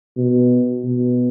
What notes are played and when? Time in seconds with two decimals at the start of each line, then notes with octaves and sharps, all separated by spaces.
0.17 B2
0.85 B2